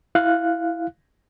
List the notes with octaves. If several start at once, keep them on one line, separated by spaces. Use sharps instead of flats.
E4 F5 F#6